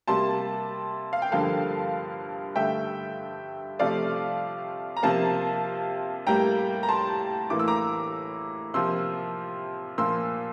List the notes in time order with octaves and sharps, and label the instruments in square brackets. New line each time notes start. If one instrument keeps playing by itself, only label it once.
[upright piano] C3 G3 A#3 A5 C6
F5
G5
G2 D3 F3 A#3 F5 A5
G2 D3 A3 E5 G5
C3 F3 A3 D5 F5
A#5
C3 F3 A#3 F5 A5
A2 G3 A#3 G5 A#5
A#5
A5 C6
A2 E3 A#3 D6
E6
A#5 D6
C3 F3 A#3 C6 E6
A#2 F3 A#3 C6 E6